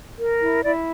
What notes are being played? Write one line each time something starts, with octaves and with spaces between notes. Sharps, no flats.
A#4
E4
E4 D5